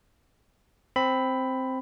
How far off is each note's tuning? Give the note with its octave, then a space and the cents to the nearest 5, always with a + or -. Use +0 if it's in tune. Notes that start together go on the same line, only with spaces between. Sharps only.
C4 +0 B5 +10